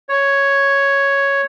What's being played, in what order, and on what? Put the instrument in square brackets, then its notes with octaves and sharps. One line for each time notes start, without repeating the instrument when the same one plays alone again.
[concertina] C#5